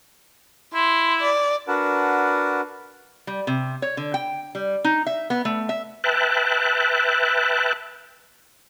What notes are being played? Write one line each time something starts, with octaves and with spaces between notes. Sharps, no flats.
E4 C6
D5
D4 F#4 A#4 B4 F#5 A5
G3
C3
C#5
D3
G5
G3
D#4
E5
B3
A3
E5
B4 E5 G5 A5 F#6